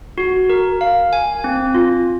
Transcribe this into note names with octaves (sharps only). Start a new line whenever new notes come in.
F#4
A#4
F5
G#5
C4
F4